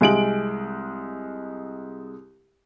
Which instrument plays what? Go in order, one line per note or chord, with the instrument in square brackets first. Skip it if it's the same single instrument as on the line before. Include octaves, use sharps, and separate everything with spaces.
[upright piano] C2 G#3 D7 F#7